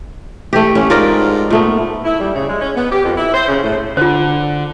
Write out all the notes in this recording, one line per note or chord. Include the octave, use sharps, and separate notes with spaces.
E3 A3 G4
A1 C#4
G#2 F4 A#4 D5
A#2 A3 B3
E4
G3
C#3
G#3
C#4
B3
G4
F2
E4
C5
C#3
A2
D3 F4 C5